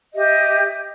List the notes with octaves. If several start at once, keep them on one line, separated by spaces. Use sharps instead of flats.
G4 D#5 E5